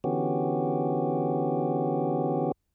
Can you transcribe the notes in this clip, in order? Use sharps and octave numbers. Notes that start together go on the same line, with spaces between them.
D3 E3 B3 C#4 F#4 G4